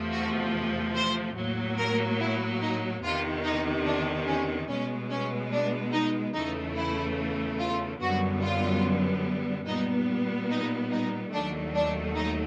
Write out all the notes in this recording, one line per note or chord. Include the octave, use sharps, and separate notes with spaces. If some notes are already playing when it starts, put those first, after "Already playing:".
Already playing: E2 C3 F3 A3
F#4
C5
A2 F#3 A#3
A#4
E4
D#4
E2 C3 D#3 F4
D#4
D4
C#4
B2 G#3 B3 C#4
C#4
D4
D#4
E2 C#3 E3 A3 D#4
E4
F4
F#2 D3 G3 B3 F#4
F4
A#2 G3 B3 D#4
D#4
D#4
D#2 D#3 F#3 A3 D4
D4
D#4